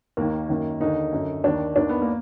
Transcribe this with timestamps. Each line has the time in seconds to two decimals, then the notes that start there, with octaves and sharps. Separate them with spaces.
0.17 D#2 D#3 A#3
0.48 F#2 D#3
0.80 D#2 D3 D#4
1.12 F#2 D3
1.44 D#2 D#3 D4
1.76 D#2 D#3 D4
1.89 B3
2.02 A#3